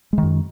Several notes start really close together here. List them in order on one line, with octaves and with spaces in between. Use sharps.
G#3 D#3 F#2